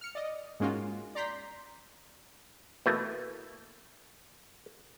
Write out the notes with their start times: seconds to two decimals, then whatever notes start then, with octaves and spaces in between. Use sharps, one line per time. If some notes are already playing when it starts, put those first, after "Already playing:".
0.01 F6 C#7
0.15 D5 D#5
0.60 G#2 G#3 A#3 C#4 F4 F#4
1.15 D5 A#5 C6 G6 B6
2.86 B2 E3 A3 A#3